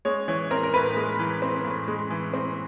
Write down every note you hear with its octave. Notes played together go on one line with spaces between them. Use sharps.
G#3 C#5
E3 C#5
C4 A#4
A#4
A2 B4
G#3
E3
C4
A2
G#3
E3
C4